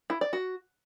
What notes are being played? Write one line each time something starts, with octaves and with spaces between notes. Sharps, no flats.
E4
D5
F#4